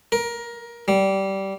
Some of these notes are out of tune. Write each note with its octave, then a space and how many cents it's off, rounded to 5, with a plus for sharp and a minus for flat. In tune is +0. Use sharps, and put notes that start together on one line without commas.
A#4 +20
G3 -15